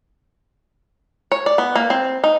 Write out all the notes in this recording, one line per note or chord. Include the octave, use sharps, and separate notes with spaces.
C#5
D5
B3
A#3
C4
D#4